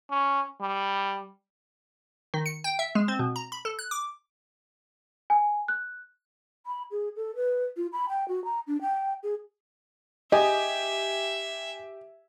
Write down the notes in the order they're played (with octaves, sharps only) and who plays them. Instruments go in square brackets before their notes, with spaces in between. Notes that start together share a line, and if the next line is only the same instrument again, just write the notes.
[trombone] C#4
G3
[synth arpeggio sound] D#3
C#7
G5
E5
G#3
C4
B2
A#5
B5
A4
F#6
D6
[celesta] G#5
F#6
[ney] B5
G#4
A4
B4
F4
B5
G5
F#4
A#5
D4
G5
G#4
[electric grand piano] G4 [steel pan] D#5 [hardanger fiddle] E5 [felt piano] G#5